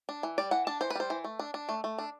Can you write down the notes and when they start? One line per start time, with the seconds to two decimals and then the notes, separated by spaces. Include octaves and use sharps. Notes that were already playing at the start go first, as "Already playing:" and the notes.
0.09 D4
0.23 E3
0.38 G3 D5
0.51 E3 F#5
0.67 D4 A5
0.81 E3 C5
0.90 B4
0.95 G3 C5
1.10 E3
1.24 A3
1.39 D4
1.54 D4
1.69 A3
1.84 A3
1.98 D4